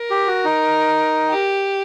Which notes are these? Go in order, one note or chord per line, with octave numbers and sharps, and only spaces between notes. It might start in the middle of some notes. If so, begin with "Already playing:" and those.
Already playing: A#4
G4
F#4
D#4
G4